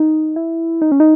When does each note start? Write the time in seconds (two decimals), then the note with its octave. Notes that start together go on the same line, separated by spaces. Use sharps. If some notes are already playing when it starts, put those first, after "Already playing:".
Already playing: D#4
0.36 E4
0.82 D#4
0.92 C#4
1.00 D#4